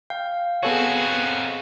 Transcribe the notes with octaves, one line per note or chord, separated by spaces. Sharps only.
F5 G5
B3 C4 F#4 G#4 A4 C#5 G#5